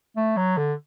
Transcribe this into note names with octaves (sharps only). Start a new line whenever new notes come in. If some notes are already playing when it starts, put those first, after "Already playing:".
A3
F#3
D3